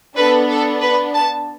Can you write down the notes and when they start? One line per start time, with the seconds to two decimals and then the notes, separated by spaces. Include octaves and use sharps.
0.16 B3 D4 A4 B4
0.48 A4
0.81 B4
1.13 A5